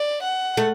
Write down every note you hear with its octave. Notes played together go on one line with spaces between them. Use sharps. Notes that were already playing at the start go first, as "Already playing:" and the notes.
Already playing: D5
F#5
A3